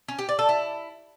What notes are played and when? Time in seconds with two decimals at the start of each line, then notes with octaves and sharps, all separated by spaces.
0.08 C#4
0.19 G4
0.29 D5
0.39 A4
0.49 E4